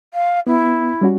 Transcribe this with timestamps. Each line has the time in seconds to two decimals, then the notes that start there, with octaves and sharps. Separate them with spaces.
0.14 F5
0.47 B3 E4
1.01 G3 C#4 F#4